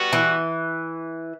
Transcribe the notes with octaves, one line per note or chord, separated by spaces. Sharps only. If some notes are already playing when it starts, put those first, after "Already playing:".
Already playing: G3 B3 F#4
E3